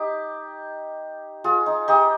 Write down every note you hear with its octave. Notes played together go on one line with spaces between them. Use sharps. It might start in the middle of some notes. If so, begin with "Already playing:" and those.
Already playing: D#4 G4
F4 G#4
D#4
D#4 G4